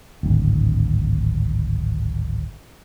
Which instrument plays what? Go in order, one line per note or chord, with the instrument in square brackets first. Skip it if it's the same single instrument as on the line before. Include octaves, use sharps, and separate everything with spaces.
[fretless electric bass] D1 G#1